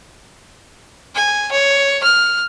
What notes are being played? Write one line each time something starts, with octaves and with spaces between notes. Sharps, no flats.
G#5
C#5
F6